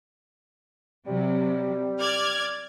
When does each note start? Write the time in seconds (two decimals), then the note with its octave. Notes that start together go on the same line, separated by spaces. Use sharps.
1.07 C3 F#3 G3
1.99 D5 F6 G#6